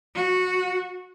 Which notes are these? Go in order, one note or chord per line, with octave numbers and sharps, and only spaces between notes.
F#4